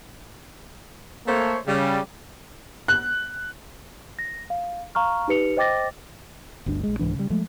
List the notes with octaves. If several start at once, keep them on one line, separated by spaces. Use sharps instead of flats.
A3 A#3 A4 C5 C#5
C#3 G3
F#6
A#6
F5
F5 A#5 C#6 F6
D#4 G4 B4 C#7 F7
C5 D#5 G5 D6 A6 A#6
G1 D2 G2 D4
A#1 G#3
C2 G#2 E3 D4
C#3 G3
F3 G#3 A3